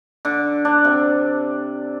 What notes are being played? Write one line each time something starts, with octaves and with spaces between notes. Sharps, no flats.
D3
D4
C3